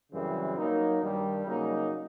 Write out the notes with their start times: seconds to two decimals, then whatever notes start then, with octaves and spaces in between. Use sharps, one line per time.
0.12 F#2 C#3 E3 G3 C4
0.56 F#3 A#3 D#4
1.00 G2 D#3 G3
1.45 C#3 F#3 A#3 D#4